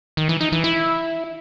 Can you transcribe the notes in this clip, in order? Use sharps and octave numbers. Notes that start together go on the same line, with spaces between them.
D#3
E3
D#4
E3
E4